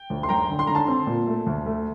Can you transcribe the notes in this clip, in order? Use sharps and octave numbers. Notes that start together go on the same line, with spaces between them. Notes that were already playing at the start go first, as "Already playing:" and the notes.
Already playing: G5
D2
C6
F#2 G5 A#5
D3
C6
D3 A#5
A5 C6
C4
A#2
A3
D2
A3